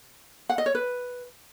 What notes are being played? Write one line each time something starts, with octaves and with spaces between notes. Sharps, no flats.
F#5
D#5
C#5
B4